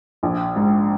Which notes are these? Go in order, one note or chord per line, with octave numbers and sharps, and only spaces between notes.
A#1
G#2